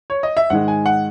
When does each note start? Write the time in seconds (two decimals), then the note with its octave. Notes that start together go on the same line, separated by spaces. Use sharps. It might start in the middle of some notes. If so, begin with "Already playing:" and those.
0.10 C#5
0.23 D#5
0.37 E5
0.50 G#2 D#3 G#3 F#5
0.68 G#5
0.86 F#5